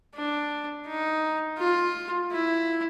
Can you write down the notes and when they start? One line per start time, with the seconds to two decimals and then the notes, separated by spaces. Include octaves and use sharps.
0.15 D4
0.87 D#4
1.59 F4
2.31 E4